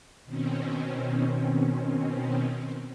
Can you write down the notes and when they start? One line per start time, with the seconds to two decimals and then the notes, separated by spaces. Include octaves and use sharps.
0.25 B2 D#3 C4 C#4